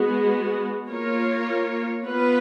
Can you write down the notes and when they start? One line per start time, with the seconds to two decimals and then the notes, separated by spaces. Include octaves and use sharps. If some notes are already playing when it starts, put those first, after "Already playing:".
Already playing: G#3 B3 F#4
0.89 A#3 F4 A#4 C#5
2.06 B3 F4 B4